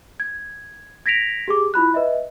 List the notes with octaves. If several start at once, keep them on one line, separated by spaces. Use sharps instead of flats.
G#6
G#6 A#6 B6 D7 F7
G4 G#4 D6
E4 F4 B5 F#6
B4 D#5 E5